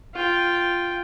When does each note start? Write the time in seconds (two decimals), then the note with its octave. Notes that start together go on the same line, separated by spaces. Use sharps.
0.14 F4 G5